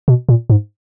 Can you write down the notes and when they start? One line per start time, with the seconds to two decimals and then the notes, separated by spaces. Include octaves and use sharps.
0.08 B2
0.29 A#2
0.50 G#2